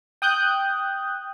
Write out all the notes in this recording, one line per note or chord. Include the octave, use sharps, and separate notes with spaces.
G5 D#6 F#6 G6